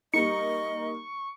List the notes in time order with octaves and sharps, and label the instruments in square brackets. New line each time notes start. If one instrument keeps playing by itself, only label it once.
[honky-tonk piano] G3 A#3 D#4 [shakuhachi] D#5 [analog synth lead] C#6 [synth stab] C#7